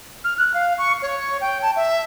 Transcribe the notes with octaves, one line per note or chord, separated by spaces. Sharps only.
F6
F#6
F5
C#6
C#5
G5
A5
E5